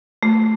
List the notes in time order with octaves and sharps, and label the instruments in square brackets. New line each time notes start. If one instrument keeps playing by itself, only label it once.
[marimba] A3